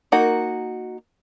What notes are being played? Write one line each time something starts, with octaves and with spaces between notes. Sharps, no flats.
A#3 D#4 F#4 A#4